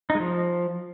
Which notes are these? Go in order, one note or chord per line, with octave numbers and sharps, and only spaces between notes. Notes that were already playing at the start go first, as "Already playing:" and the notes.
D#4
G#3
F3